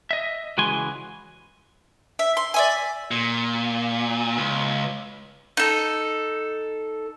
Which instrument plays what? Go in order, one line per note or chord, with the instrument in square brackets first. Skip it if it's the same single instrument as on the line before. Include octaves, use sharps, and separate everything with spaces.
[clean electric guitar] D#5 E5
C#2 E3 G#3 F#4 G#5 C6
[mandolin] E5
C6
D5 E5 G#5
[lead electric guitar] A#2
C#2
[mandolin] D#4 A4